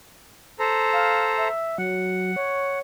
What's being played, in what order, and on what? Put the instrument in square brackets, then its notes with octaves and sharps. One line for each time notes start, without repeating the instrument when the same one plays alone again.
[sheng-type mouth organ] A4 C5 A#5
[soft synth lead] F5
E5
[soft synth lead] F#3 [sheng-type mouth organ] F#5
[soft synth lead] C#5